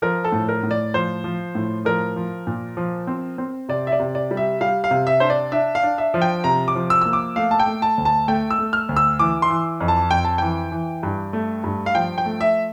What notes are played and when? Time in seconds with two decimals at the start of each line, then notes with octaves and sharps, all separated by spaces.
0.02 F3 A#4
0.24 A4
0.32 A2
0.49 A#4
0.63 A2
0.71 D5
0.94 F3 C5
1.24 F3
1.55 A2
1.85 F3 A#4
2.16 F3
2.47 A#2
2.77 F3
3.07 C4
3.38 C4
3.69 C3 D5
3.87 E5
3.92 D5
4.00 C3
4.15 D5
4.31 G3
4.37 E5
4.61 G3 F5
4.84 F5
4.91 C3
5.07 E5
5.20 D4 C5
5.30 D5
5.52 D4 E5
5.75 F5
5.83 D4
5.98 E5
6.14 F3
6.22 G5
6.44 C3 A#5
6.68 D6
6.75 F3
6.90 E6
7.01 A#3 E6
7.13 D6
7.36 A3 F5
7.51 A5
7.59 G5
7.66 A3
7.82 A5
7.98 D2
8.05 A5
8.28 A3 G5
8.51 E6
8.59 A3
8.73 F6
8.89 D2
8.97 E6
9.19 E3 D6
9.42 C6
9.50 E3
9.81 F2
9.88 A5
10.11 F2 G5
10.24 A5
10.38 E3 G5
10.72 E3
11.03 G2
11.33 A3
11.64 G2
11.86 F5
11.95 F3 G5
12.18 G5
12.26 A3
12.41 E5